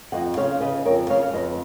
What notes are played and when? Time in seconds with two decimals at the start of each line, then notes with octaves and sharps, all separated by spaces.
0.12 F2 D#5 F#5
0.37 C#3 C#5 F5
0.61 C#3 B4 D#5
0.85 F2 A#4 C#5
1.10 C#3 C#5 F5
1.33 F2 B4 D#5